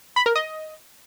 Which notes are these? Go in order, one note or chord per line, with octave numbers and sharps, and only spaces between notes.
B5
A#4
D#5